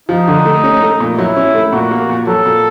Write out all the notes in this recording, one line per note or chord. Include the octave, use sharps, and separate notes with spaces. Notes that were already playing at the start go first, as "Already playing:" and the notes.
F3 D#4
D3
A3
C#4
A3
A#2
F#3 E4
C#4
A3
A#2 F#4
A#3
A#2
F#3 A4
A#2